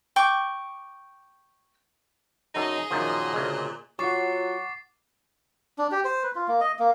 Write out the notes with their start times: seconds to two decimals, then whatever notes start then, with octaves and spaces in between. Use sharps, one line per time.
0.16 G5 C#6 D6
2.54 F#2 D#4 G#4 A4 D#5
2.91 F#2 A#2 D#3 F3
3.33 D2 C#3 G#3
3.99 F#3 F4 F#5 C#6 D6 A6 C7
5.78 D4
5.91 G4
6.05 C5
6.23 B4
6.35 F4
6.48 A#3
6.60 D#5
6.79 A#3